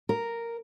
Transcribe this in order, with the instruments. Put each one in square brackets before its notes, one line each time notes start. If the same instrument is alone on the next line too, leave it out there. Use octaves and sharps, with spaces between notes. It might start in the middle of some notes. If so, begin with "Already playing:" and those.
[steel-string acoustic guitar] A#4